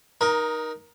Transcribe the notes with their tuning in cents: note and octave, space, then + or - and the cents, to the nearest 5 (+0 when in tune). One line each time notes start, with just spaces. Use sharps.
D#4 +0 A#4 +25